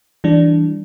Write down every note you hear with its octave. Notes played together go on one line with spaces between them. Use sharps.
E3 G3 D4